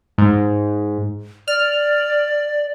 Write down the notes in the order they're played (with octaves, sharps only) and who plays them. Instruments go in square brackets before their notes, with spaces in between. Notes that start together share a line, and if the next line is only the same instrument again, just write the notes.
[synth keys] G#2
[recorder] D5 [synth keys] F6